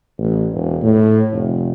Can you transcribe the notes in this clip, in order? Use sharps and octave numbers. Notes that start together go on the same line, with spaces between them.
A1
E1
A2
F1